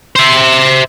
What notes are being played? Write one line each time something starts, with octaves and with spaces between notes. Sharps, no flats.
C5 E5